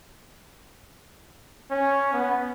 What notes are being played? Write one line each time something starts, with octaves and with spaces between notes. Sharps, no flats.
C#4
B3